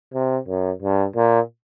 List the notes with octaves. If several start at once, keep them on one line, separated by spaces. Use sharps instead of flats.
C3
F#2
G2
A#2